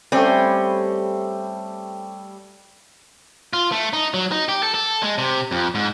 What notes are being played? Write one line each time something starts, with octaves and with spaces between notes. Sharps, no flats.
G3 A3 C4 C#4 G4
F4
A3
D#4
F#3
D#4
G4
A4
A4
G#3
C3
F2
G#2